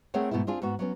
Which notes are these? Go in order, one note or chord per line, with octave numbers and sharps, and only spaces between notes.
A3 C4 G#4 A#4 C#5 F#5
G#2 B2 A3 B3 E4
C4 D4 F4 G#4
G#2 B3 F#4
F#3 B3 C#4